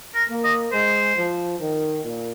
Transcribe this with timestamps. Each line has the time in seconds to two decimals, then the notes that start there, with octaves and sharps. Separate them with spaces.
0.15 A#4
0.29 A#3
0.44 D#5
0.72 G#3 C5
1.16 F3
1.59 D#3
2.03 A#2